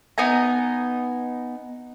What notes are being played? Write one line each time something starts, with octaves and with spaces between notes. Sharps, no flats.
B3 D#4 G#5 A#5